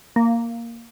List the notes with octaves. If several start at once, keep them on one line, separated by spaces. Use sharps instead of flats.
A#3